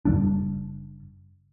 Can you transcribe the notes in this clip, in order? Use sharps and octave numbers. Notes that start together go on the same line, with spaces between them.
F#1 E2 G3 D4